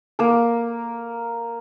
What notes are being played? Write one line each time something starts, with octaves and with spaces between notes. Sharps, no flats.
A#3 A#4